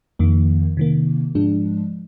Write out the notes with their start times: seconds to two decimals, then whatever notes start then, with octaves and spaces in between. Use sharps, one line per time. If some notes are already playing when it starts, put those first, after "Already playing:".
0.19 F2 D#3 A#3
0.77 C3 D#3 A#3
1.35 G#2 F3 G#3 D4